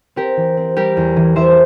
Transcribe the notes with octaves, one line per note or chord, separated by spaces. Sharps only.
C4 G4 A#4
E3
C4
G3 G4 A#4
E2
E3
E3 C5 E5